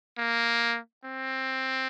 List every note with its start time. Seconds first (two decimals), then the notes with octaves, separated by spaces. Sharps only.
0.18 A#3
1.04 C4